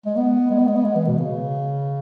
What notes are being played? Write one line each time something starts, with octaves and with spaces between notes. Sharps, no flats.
G#3
B3
G#3
B3
G#3
B3
G#3
E3
B2
C#3